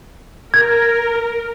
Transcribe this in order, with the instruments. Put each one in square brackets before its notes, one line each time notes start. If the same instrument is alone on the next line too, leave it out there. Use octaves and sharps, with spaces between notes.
[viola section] A#4 [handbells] G#6